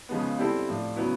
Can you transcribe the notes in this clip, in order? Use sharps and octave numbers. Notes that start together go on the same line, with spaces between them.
C#3 F3 G#3 B3
G3 C4 E4 A4
A2 F3 A3 D4
C#3 F#3 B3 E4